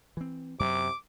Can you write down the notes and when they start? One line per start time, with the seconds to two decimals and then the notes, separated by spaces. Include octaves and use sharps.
0.17 E3 C4
0.60 F#2 C3 F#3 D6